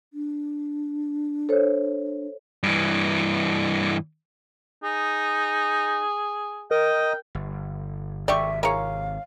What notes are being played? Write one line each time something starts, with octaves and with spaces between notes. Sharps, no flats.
D4
A4 C5 C#5
G2 E3
D#4 G#4
A#4 D#5 G5
G1
G#1 C3 A3 G4 D5 E5 C#6
E4 G#4 A#4 C#5 F5